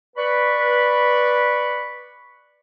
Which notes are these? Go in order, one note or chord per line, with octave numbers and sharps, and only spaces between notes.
B4 D5 B5 C#6